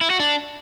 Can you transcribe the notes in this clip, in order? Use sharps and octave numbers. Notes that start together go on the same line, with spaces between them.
E4
F#4
D4